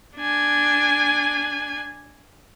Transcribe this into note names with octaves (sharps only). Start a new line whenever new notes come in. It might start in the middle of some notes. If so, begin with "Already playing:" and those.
D4 G#5